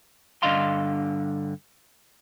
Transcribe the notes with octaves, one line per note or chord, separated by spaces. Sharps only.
G2 D3 D4 D#5 F5 C6